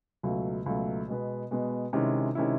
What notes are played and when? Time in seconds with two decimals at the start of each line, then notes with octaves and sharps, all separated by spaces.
0.23 C#2 B2 F#3 A3
0.66 C#2 B2 F#3 A3
1.08 B2 G#3 B3
1.51 B2 G#3 B3
1.93 C3 D#3 G#3 C#4 E4
2.35 C3 D#3 G#3 C#4 E4